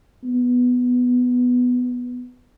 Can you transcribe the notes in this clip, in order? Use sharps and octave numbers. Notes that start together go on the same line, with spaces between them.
B3